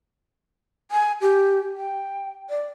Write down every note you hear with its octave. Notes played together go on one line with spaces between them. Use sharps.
G#5
G4
G5
D5